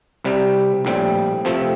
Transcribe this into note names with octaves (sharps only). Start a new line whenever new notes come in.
C2 C3 G3
A#1 A2 G3 C4
F2 C3 F3 A3 C4